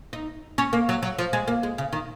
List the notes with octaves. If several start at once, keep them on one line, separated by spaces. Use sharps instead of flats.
D#4
C#4
A#3
F#3
F#3
F3
G#3
A#3
G#3
C#3
D#3